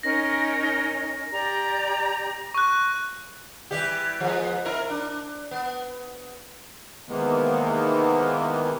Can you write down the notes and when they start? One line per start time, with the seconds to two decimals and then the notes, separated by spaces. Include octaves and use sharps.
0.03 C#4 D#4 A#4 A#6
1.32 G4 D5 A#5
2.54 C#6 F#6
3.71 E3 G3 G4
4.20 F3 G#3 B3
4.65 C4 E4 A#4
4.90 D4
5.51 B3
7.08 C3 D#3 E3 G#3 A#3 B3